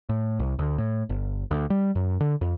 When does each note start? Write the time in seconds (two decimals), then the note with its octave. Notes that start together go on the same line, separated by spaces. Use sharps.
0.09 A2
0.40 C2
0.59 D2
0.78 A2
1.09 G1
1.51 D2
1.70 G3
1.95 F#2
2.20 D3
2.41 F2